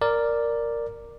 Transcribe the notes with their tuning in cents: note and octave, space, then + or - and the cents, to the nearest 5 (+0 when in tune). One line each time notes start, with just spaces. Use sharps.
A#4 -5 D5 +0